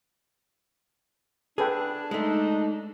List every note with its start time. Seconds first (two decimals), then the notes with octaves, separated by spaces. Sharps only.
1.58 D4 G#4 A4 B4 G5
2.11 G#3 A3 D#4